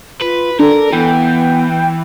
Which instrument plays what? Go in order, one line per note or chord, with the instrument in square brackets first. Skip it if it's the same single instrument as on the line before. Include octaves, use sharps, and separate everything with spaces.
[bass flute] F4 [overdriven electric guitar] B4
[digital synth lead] D4 [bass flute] A4 [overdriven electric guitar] A#4
[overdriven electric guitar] E3 [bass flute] B3 [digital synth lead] G5